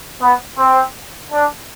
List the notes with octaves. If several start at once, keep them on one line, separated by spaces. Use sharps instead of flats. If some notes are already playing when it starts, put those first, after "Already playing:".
B3
C4
D4